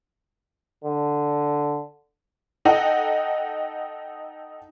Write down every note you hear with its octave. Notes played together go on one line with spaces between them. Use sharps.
D3
D#4 A4 D#5 F#5 G5